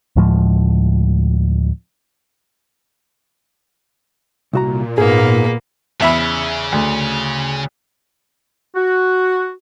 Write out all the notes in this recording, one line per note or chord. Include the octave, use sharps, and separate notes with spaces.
D2 A2 F3 G#3
C2 A#2 F#4 A#5
G#2 A#3 B3 F4 G#4
E2 C#3 E5 B5
D2
F#4